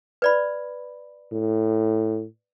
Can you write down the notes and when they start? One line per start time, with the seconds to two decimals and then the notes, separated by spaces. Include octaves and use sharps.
0.22 B4 D5 B5
1.32 A2